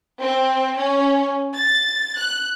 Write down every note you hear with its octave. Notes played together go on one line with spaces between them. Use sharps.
C4
C#4
A6
F#6